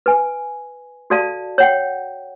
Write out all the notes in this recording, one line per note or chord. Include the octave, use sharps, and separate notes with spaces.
B4 G#5
F#4 A4 D5 F5 A5
C#5 F#5 G5